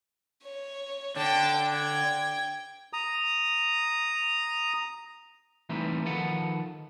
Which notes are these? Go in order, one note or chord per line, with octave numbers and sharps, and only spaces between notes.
C#5
D3 G5 A5
G5 G#6
A#5 D#6
E3 G3 A3 C4 D#4 B4
D#3 F3 A4 B4 F#5